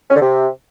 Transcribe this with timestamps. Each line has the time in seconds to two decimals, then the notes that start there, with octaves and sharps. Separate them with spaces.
0.11 C#4
0.16 D3
0.22 C3